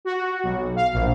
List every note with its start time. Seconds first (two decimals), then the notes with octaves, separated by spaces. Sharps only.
0.05 F#4
0.43 B1
0.76 F5
0.93 A#1